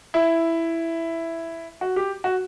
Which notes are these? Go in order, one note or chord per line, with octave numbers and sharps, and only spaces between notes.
E4
F#4
G4
F#4